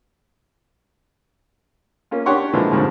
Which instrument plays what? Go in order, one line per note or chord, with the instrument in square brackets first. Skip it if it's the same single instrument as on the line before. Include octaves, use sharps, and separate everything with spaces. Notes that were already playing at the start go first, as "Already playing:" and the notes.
[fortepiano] A#3 C#4 F4
D4 G4 C#5 F#5 C6 C#6
D3 E3 F3 G#3 A#3 B4
C2 F2 G#2 D3 F3